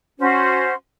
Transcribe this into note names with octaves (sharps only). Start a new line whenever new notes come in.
C#4 F#4 C5